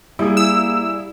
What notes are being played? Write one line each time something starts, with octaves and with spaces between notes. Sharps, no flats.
G3 A#3 E4 G#4
E6